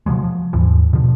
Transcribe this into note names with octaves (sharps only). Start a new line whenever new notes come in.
C3 F3 F#3 G#3
F3
D#2 G#2 E3 F3
B2 D3 F3